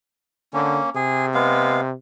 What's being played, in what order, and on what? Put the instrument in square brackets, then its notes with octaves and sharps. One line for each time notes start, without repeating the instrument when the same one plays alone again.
[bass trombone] D3 [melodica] A#3 C#4
[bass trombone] C3 [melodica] G#4
[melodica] G#3 B3 F5